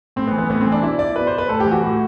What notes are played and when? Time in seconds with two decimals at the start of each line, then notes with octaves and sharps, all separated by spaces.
0.16 A2 C4
0.28 B3
0.33 E3
0.38 B3
0.50 A2 B3
0.61 C4
0.66 E3
0.72 D4
0.83 B2 E4
0.99 D5
1.16 B2 B4
1.27 C5
1.38 B4
1.49 A2 A4
1.60 G4
1.66 E3
1.71 F#4
1.83 A2